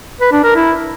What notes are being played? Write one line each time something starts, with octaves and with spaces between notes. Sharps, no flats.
B4
D4
A#4
E4